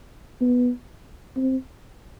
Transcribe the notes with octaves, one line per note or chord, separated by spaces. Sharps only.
B3
C4